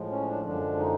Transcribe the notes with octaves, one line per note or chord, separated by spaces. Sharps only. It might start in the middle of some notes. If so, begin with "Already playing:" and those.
Already playing: A2 F3 G#3
C#4
D4
F#2 D3 F3 G#3 D4
D#4